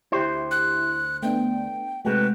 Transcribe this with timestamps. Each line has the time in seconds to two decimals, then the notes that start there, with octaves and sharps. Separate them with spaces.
0.12 D2 E4 G4 C5
0.51 F#6
1.23 A3 B3 D4 G5
2.05 C3 G#3 A3 F#4 B4